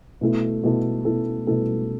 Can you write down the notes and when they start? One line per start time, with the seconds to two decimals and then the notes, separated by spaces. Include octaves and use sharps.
0.21 B2 A3 E4 A4
0.63 B2 A3 E4 A4
1.05 B2 A3 E4 A4
1.47 B2 A3 E4 A4